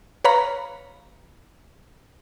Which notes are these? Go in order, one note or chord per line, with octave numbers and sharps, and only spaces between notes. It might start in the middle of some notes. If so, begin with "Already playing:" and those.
B4 C#5 F5 A#5 B5